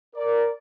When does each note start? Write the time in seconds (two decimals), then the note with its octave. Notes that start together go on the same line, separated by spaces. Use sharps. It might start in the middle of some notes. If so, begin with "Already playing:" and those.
0.16 A#4 D5